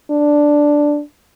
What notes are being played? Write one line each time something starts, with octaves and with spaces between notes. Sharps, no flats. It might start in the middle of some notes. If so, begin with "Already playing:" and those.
D4